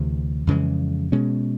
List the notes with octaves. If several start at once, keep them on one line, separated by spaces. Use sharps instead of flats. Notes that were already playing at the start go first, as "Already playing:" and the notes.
Already playing: D2 C3 E3
F2 C#3 E3 G#3
B2 G#3 C#4